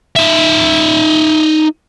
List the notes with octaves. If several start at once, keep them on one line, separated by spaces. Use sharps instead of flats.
D#4 E5